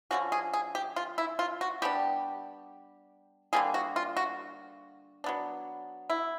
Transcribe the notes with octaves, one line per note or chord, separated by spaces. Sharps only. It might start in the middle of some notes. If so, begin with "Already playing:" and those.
D3 F3 A#3 C#4 F#4
G#4
G#4
G4
F4
E4
F4
F#4
G3 B3 D4 G4
D3 G3 A#3 G#4
F#4
F4
F#4
F#3 B3 D4
E4